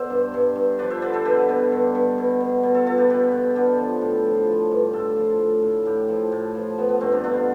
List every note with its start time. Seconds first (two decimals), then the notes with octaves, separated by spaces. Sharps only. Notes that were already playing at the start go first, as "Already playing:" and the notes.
Already playing: B2 A4 C5 D5 E5
0.10 G2
0.34 G2
0.56 G2
0.79 F3 B4 D5
0.90 C5 E5
1.02 D3 B4 D5
1.13 A4 C5
1.25 B2 G4 B4
1.49 B2
1.72 G2
1.95 G2
2.18 B2
2.40 B2
2.63 B2
2.74 F4 A4
2.86 B2 F4 A4
2.98 G4 B4
3.09 B2 G4 B4
3.32 B2
3.55 D3 G4 B4
3.78 F3
4.01 A2
4.25 F3
4.47 F3
4.71 G2
4.93 A2 F4 A4
5.17 F3
5.39 A2
5.62 A2
5.85 A2 E4 G4
6.09 F3
6.32 A2
6.55 F3
6.78 F3 B3
6.89 B3
7.01 G2 A3 C4
7.12 B3 D4
7.24 B2 D4 F4